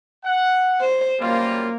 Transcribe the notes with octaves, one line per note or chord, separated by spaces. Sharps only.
F#5
C5
F#2 G3 A#3 F4